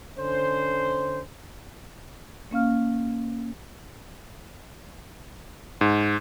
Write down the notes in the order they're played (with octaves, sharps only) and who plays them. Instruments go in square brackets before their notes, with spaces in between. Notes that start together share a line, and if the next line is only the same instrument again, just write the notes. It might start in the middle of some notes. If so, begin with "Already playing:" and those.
[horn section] D3 C#4 C5
[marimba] A#3 C#4 F5 F6
[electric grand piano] G#2